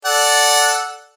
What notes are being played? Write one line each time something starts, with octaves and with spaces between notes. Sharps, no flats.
A4 D5 F#5